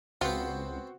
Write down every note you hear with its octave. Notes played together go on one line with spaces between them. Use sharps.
C#2 B3 C4 F4 F#4 C5 F#5